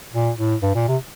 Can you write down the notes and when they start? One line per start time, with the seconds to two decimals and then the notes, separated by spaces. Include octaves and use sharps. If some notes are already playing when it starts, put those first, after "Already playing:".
0.13 A#2
0.38 A2
0.63 G2
0.75 A#2
0.88 C3